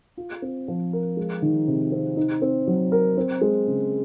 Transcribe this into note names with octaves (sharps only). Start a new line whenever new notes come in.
F4
C4
F3
A#4
G#3
D#3
C3
C4
D#4
C4
F#3
A#4
C4
G#3
C#3